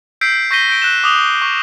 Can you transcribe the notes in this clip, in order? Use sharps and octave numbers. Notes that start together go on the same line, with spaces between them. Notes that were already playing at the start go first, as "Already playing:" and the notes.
E6 G6 B6 C7 D7
C#6 G6 A#6 B6 D#7 G7
G6 D7
F#6 E7
D6 D#6 F7 G7
C#6